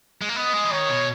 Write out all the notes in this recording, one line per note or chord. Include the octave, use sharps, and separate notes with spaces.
G#3
A#3
B3 D#5
G#3
E3
D#3 C#5
B2